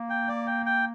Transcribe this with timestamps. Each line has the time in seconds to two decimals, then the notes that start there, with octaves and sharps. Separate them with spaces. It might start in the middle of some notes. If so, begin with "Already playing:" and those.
Already playing: A#3
0.10 G5
0.28 D5
0.47 G5
0.66 G5